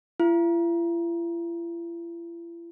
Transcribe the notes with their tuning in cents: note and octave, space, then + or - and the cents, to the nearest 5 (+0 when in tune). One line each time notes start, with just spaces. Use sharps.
E4 +45